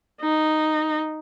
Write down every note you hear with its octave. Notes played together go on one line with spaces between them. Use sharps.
D#4